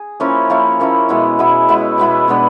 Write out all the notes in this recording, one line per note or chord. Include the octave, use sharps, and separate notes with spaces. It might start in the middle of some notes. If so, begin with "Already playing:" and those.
Already playing: G#4
F3 A#3 C#4 E4
F3 A#3 C#4 E4
F3 A#3 C#4 E4
B2 G#3 B3 E4
B2 G#3 B3 E4
B2 G#3 B3 E4
B2 G#3 B3 E4
B2 G#3 B3 D4